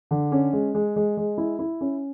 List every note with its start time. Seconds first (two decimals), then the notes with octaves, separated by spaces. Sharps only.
0.11 D3
0.32 C#4
0.53 G#3
0.75 G#3
0.96 G#3
1.17 G#3
1.38 E4
1.59 E4
1.81 C#4